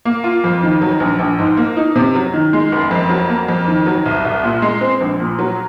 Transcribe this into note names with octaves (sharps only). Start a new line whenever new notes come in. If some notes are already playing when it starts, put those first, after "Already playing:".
A#3
F4
F2
D#3
F#3
A#1
A#1
G#2
A#3
D#4
C3
F#3
D#3
G#3
F#1
F2
F#3
A#3
F2
D#3
F#3
C2
C2
A#2
G#3
C4
A#1
A#2
F#3